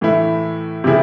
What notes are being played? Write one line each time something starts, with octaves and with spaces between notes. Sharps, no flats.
A2 E3 A3 E4
C3 E3 B3 E4 G#4